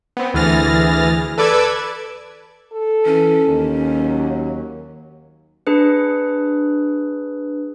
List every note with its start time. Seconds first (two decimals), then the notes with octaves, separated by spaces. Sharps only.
0.17 B3 C4
0.34 D2 E3 G#4 F6 A6 A#6
1.38 A4 B4 D5 D6 E6 G#6
2.72 A4
3.06 E3 C#4
3.48 D#2
3.96 F#3
5.67 D4 G#4 B4